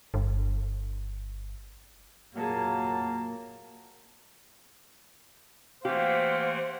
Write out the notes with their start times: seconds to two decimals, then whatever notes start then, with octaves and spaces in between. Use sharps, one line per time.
0.14 G1
2.37 A#2 F#3 A#3 G#4 A5
5.85 E3 A3 A#3 G4 C5 F5 F#5